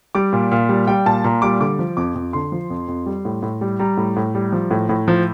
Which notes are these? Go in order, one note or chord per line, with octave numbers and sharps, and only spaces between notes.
G3 D6
A#2
A#2 F5
G3
G3 G5
A#2 A5
A#2 A#5
G3 D6
D3 D6
F3
F2 D6
F2
D3 C6
F3
F2
F2
G3
A2
A2
G3
G3 A#5
A2
A2
G3
F3
A2
A2
F3